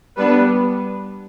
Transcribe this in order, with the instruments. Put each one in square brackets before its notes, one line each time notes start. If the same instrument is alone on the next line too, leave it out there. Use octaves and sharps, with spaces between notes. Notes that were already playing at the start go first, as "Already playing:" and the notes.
[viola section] G3 B3 D4 B4